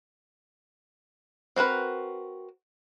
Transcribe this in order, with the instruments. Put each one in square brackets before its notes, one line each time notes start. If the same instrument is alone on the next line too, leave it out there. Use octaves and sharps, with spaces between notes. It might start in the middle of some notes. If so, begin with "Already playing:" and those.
[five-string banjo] C4 F#4 A#4 B4